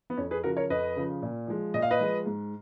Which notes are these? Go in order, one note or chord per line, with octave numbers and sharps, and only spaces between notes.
B3
F2 C#4
G#4 B4
C#3 F3 F#4 A#4
A#4 C#5
F2 B4 D#5
C#3 F3
A#2
F3 G#3
A#2 D#5
F5
B4 D#5
F3 G#3
G#2